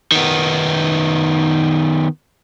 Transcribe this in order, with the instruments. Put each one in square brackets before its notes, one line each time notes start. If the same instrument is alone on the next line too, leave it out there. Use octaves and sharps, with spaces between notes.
[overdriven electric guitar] D#3 B3